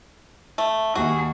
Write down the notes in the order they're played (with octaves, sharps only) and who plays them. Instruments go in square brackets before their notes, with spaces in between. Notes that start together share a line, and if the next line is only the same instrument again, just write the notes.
[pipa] A3
[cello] D#2 G#4 [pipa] F#4